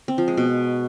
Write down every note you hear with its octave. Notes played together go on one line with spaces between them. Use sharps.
C4
F3
G#3
B2